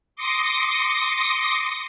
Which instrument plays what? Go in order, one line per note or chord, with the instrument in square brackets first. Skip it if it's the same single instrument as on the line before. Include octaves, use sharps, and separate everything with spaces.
[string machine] C6 D6 D#6 A#6 C#7